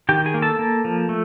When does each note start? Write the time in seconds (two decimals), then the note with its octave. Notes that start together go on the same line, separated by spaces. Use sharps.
0.09 D#3 G4 G5
0.26 G#4 G#5
0.34 A#3
0.42 A4 A5
0.59 A#3
0.85 F3
1.09 A3